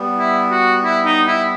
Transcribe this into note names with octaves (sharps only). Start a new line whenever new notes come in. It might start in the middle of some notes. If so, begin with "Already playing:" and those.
Already playing: G3 B3
E4
F#4
E4
D#4
E4